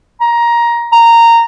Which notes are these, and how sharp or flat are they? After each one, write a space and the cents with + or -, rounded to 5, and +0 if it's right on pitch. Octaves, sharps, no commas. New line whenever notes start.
A#5 +15
A#5 -10